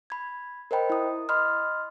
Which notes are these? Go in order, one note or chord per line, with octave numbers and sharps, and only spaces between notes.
B5 G#6
A#4 C5 D#5 G5 B5
E4 D#6
D#5 B5 C6 D#6 F6